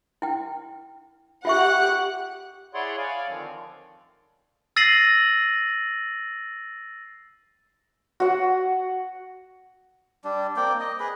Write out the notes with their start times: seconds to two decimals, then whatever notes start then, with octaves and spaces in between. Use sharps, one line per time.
0.22 E4 G5
1.45 F4 G4 E5 F#5 C#6 F#6
2.74 E4 G#4 C#5 D5 F#5 C6
2.98 C#5 D5 F5 G#5
3.27 D3 D#3 F3 C4
4.76 E6 A6 A#6 C7 D#7 F#7
8.20 F#4 F#5
10.24 G3 D4
10.56 A#3 C4 D5 G5
10.80 D#5
11.00 G#4 B4